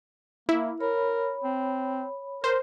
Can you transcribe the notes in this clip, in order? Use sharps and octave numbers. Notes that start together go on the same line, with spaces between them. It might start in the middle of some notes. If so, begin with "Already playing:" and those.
A#3 E4
A#4 C#5 B5
C4
A#4 C5